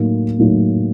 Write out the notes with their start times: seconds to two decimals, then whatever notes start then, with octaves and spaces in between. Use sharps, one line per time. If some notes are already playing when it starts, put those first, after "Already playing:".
Already playing: A2 F#3 A#3 D#4
0.39 A2 F#3 A#3 D#4